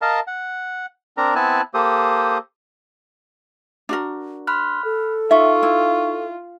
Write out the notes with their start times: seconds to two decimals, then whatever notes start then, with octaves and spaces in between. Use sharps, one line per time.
0.02 A#4 D#5 F5 A5
0.27 F#5
1.17 C4 D4 A#4 A#5
1.35 B3 C4 E4 G#5 A5 F#6
1.74 A#3 G4 A4 C5 D#6
3.89 D4 F#4 A#4
4.47 B5 C6 F6 F#6
4.85 A4
5.31 D#4 F4 E5 C#6
5.63 E4